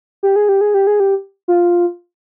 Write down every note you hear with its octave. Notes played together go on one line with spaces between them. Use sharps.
G4
G#4
G4
G#4
G4
G#4
G4
F4